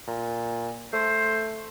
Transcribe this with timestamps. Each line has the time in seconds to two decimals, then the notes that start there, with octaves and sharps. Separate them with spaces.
0.08 A#2
0.93 A3 C5